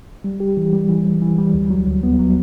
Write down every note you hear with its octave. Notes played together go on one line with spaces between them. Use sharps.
G3
G4
E3
G3
E3
G3
E3
G3
D2
F#3
D2
B3
F#3